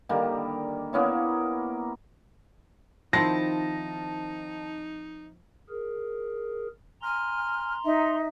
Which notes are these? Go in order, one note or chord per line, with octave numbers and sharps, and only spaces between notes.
D3 D#3 G3 A#3
A#3 B3 C#4 E4
D#3 F3 C4 D#4 E4 A5 A#6
G#4 A#4
G#5 A#5 C6 F6
D#4 E5